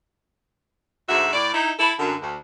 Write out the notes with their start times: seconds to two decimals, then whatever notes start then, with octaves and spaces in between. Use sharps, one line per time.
1.08 D2 G#2 F#4 E5
1.33 A2 D5
1.54 D#4 E4
1.79 E4 A4
2.00 F#2 D3
2.21 D2